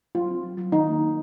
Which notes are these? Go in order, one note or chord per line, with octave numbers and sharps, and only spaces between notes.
F#3 F4
C4
F#3
F#3
D#3 D#4
A#3
D#3